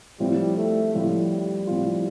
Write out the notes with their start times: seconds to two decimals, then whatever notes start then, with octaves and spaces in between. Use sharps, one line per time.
0.19 A2 F3 G3 C4 F4
0.57 A3
0.94 A2 F3 G3 C4 F4
1.67 A2 F3 C4 F4